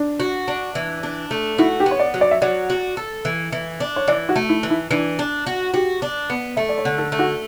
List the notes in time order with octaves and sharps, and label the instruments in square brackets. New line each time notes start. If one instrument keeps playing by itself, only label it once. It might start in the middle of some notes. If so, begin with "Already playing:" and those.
Already playing: [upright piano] D4
[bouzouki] F#4
D4
E3
D4
A3
[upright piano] E4 [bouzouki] F#4
[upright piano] G4
[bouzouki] B3
[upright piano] C#5
D5
[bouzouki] F#3
[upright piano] D5
E5
[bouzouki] F#3 [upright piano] D5
[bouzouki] F#4
A4
E3
E3
D4
[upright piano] C#5
[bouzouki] E3 [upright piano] D5
[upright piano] F#4
[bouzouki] A3
[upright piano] E4
[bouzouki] E3
[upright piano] E4
[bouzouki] E3 [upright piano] D4
[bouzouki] D4
F#4
[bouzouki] F#4 [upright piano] G4
[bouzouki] D4
B3
[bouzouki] A3 [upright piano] E5
[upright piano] D5
C#5
[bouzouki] D3
[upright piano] A4
[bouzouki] A3
[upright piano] F#4